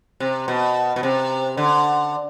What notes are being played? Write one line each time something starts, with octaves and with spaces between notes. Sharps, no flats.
C3
B2
B2
C3
D3